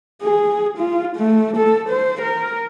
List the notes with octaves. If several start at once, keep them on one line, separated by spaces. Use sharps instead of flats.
G#4
F4
A3
A4
C5
A#4